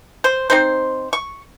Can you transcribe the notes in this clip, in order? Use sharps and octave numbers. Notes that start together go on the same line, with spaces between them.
C5
C4 D#4 C5
C#6